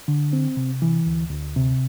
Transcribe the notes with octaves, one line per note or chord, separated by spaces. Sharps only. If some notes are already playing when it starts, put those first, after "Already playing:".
D3
C4
C3
E3
D2
D2
C3